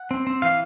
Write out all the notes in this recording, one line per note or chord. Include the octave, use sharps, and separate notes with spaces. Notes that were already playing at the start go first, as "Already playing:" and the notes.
Already playing: F#5
C4
C4
E3 F5